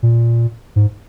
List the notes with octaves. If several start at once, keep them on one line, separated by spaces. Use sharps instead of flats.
A#2
G#2